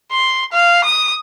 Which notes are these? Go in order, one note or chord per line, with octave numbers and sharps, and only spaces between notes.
C6
F5
D#6